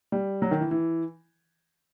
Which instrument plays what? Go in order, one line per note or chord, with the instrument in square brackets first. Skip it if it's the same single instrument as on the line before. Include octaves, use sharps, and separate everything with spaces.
[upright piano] G3
F#3
D#3
E3
E3